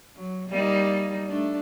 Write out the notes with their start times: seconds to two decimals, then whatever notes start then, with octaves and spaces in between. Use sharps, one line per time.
0.15 F#3
0.48 G3 A#3 D#4
1.28 A3 D4